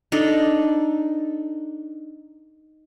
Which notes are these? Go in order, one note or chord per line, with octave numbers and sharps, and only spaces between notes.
D4 D#4 A4